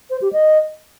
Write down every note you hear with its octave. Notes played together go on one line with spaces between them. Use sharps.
C5
G4
D#5